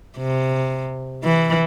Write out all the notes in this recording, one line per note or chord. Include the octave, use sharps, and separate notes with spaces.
C3
E3